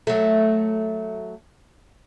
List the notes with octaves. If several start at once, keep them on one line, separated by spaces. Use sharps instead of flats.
F#3 A3